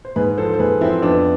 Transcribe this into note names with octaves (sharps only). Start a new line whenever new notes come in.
C5
G#2 G#4 B4
F3 A4 C5
C5
G#2 G#4 B4
F3 C4 E4
F2 B3 D4